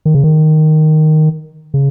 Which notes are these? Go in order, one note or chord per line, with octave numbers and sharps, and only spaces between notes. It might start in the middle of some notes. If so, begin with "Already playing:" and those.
D#3
C#3
D#3
C#3